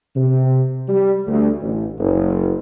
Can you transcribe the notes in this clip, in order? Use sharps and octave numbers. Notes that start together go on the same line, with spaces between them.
C3
G3
D2
A1
F#1